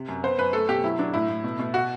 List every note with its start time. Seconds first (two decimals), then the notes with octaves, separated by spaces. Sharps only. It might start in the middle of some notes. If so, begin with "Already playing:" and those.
Already playing: C3
0.08 F#2
0.23 B3 C5
0.38 F#2 B4
0.53 A3 A4
0.69 B2 G4
0.84 F#3 E4
0.99 F#3 D4
1.13 A2 E4
1.29 A2
1.44 B2
1.59 B2
1.74 F#4